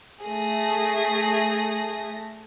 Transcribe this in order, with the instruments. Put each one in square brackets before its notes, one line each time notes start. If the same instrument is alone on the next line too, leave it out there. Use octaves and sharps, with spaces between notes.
[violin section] A3 A#6 [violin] G#4